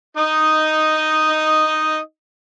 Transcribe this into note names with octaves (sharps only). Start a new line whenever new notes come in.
D#4 D#5